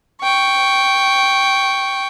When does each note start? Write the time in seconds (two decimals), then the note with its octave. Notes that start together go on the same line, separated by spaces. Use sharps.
0.22 G5 C#6